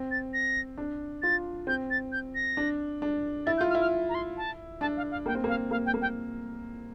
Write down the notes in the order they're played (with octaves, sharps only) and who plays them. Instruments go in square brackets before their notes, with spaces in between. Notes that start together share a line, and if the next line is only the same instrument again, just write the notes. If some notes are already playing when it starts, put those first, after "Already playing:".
Already playing: [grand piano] C4
[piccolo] A6
A#6
[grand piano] D4
[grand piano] F4 [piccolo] A6
[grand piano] C4 [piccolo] G6
[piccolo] A6
G6
A#6
[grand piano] D4
D4
[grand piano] E4 [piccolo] A6
[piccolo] G6
[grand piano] F4
[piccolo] F6
[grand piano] E4
[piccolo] F6
A#5
C6
A5
[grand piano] D4 [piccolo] A5
[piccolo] F5
F5
[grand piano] A#3 [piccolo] G5
[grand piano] C4
[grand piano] A#3 [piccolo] F5
[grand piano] A#3 [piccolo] F5
[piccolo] G5
[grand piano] A#3
[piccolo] G5